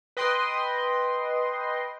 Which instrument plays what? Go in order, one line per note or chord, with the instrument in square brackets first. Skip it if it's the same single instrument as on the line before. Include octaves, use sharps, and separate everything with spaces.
[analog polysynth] B4 D#5 G5 C6